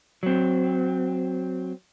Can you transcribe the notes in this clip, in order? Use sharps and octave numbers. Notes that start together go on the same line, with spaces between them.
F#3 C4